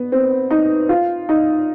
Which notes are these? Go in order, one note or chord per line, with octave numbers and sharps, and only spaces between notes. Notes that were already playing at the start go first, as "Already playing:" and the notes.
Already playing: B3
C4
D#4
F4
D#4